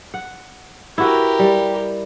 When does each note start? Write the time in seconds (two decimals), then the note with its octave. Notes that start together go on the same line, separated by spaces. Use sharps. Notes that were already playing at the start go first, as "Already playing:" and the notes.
0.14 F#5
0.98 E4 F#4 G4 A#4 B4
1.39 G3